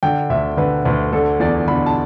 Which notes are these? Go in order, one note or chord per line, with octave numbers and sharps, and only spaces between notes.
D3 G5
D2 E5
D3 B4
D2 B4
D3 A4
E2 D5
D3 B5
A5